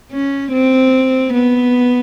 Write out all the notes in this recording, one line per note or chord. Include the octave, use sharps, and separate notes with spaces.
C#4
C4
B3